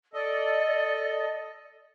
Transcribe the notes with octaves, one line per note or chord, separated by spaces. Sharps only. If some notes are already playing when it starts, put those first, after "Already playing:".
A4 D5 D#5